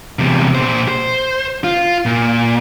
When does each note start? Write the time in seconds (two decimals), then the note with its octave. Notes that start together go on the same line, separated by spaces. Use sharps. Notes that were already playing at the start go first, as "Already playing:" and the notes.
0.19 E2 C3
0.55 A#2 C5
0.88 C5
1.64 F4
2.06 A#2